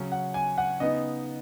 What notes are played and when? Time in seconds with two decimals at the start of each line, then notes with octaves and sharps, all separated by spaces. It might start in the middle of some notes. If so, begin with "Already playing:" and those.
Already playing: C#3 F#3 C#4
0.12 F#5
0.34 G#5
0.58 F#5
0.80 C#3 B3 D#4 D#5